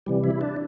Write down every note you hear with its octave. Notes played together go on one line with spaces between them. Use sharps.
C3 E3 G3
E4
D4